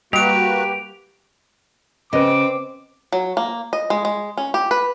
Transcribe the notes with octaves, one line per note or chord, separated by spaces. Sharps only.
G3 A#3 F#4 G4 B4 D7 F7
C#3 C4 B4 D#5 D6
F#3
A#3
D#5
G#3
G#3
C#4
G4
B4